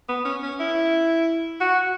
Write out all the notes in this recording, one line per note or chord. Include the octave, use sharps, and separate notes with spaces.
B3
C#4
C#4
E4
F#4